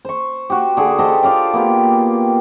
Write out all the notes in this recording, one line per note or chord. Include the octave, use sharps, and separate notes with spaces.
C5 C#6
F#4 G4
D3 G#4
G4 A4 C5 D#5
F4 D5 F5 G5
A#3 B3 G4